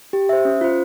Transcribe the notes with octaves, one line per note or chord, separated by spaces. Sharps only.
G4
C5 E5
C#4
F4 C5